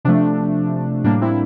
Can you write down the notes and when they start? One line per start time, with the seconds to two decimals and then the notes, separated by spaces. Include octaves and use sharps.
0.05 C3 F3 A3 D4
1.04 A2 G3 A#3 D4
1.21 C4 E4